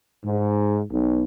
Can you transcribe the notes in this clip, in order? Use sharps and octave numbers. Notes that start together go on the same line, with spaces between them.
G#2
B1